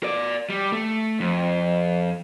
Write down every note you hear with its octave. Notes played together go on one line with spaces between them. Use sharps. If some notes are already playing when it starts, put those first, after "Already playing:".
A#4 D5
G3
A3
F2